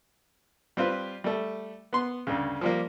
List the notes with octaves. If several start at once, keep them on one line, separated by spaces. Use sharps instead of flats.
G3 C4 F4 B4
G3 A3
B3 C6
D2 G2 C#3
F3 G3 A#3